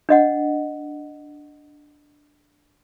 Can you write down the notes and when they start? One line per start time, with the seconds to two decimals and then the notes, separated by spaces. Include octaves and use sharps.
0.09 D4 D#5 F#5